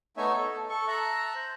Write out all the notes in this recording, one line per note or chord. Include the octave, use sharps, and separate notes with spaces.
A3 B3 D#4 C#5 E5 G#5
A4
A4 C#6
E5 A5 A#5 F#6
C5